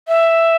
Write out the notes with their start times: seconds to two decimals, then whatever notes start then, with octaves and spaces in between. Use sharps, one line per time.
0.08 E5